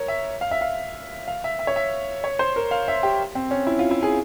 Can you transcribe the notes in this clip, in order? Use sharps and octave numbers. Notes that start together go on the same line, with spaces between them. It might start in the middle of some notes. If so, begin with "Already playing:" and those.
Already playing: A#4 C#5
E5
F5
E5
F5
F5
E5
E5
C#5
E5
C#5
C5
A#4
F5
E5
G4
C4
C#4
E4
F4
E4
G#4